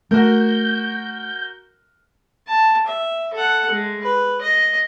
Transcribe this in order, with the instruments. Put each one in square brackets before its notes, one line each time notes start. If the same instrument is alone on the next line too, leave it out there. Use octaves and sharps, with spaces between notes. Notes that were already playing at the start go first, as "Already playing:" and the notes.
[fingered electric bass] A3 [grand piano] F#4 A#4 [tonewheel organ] G6
[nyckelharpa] A5
E5
A4 F#5
G#3
B4
D#5